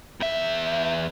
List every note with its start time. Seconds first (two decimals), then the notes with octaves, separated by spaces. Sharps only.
0.20 E2 E5